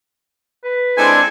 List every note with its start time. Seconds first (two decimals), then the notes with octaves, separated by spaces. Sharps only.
0.64 B4
0.97 G#3 C4 D4 E4 A4 C5 G#5